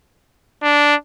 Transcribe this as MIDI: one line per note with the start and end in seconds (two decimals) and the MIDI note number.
0.62 0.95 62